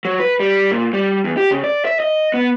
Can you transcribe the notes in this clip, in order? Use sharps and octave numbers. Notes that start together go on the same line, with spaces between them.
F#3
B4
G3
A#2
G3
E2
G4
C#3
D5
E5
D#5
B3